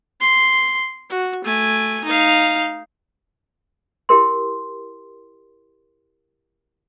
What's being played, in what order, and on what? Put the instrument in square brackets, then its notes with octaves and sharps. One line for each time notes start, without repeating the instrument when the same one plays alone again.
[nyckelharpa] C6
F#4
A3 G#5
D#4 F5
[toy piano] E4 G4 A#4 C6